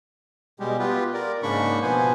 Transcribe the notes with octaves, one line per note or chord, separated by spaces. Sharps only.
B2 G3 G#3 G4
B3 F4 G4 B4
A#4 D5
G#2 C#3 A#3 D4 B5 C#6
B2 F3 B3 B4 C5 G#5